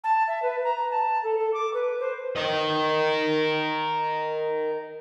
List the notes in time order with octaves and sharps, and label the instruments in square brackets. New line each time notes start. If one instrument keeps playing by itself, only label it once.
[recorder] A5
E5
B4
A#5
A5
A4
A4
D6
B4
C5
[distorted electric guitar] A#4 D#5